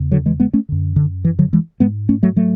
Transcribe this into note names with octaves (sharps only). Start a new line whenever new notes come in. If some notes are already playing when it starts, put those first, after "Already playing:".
Already playing: E2 C#3
D3 F#3
E3 G#3
G#3 B3
A3 C#4
F#2 D3
D3
E3
D3 F#3
E3 G#3
G#2 G#3 B3
A3 C#4
F#3 A3
F#3 A3